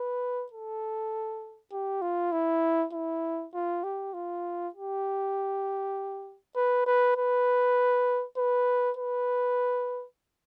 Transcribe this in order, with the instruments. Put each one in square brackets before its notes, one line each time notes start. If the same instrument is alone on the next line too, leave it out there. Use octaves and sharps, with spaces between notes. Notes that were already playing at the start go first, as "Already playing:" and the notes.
Already playing: [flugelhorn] B4
A4
G4
F4
E4
E4
F4
G4
F4
G4
B4
B4
B4
B4
B4